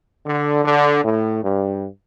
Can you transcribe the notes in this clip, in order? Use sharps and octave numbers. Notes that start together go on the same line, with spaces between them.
D3
D3
A2
G2